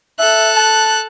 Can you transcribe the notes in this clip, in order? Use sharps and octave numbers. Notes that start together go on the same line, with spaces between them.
A4 E5 F#6
A5